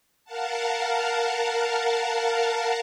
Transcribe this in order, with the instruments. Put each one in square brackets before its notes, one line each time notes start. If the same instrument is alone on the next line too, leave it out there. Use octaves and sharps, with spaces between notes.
[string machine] A#4 F5 F#5 A5